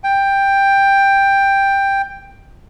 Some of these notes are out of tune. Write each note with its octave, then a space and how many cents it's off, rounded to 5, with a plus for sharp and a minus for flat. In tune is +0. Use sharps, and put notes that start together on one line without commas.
G5 +10